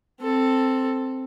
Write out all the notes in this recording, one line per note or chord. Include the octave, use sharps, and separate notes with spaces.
C4 A4